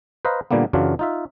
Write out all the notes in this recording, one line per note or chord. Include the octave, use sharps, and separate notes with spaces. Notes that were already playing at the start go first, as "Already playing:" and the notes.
B4 C5 D#5 F5 A#5
A#2 D3 G3 A#3 B3
F#2 C#3 E3 F#3 D4 F4
D#4 F4 E5